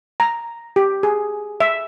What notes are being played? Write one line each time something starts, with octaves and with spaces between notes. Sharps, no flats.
A#5
G4
G#4
E5